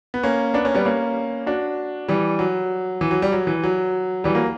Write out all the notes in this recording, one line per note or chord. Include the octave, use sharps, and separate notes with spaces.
B3
A#3 C#4
B3 D4
A#3 C#4
G3 B3
A#3 C#4
D4 F#4
E3 G3
F#3
E3
F#3
G3
F#3
E3
F#3
E3 G3
F#3 A#3